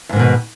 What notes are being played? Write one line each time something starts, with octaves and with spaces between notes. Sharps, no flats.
F2 G#2 B2 D#3